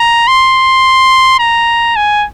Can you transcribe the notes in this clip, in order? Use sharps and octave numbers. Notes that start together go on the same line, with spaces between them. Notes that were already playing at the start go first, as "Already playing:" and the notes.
Already playing: A#5
C6
A#5
G#5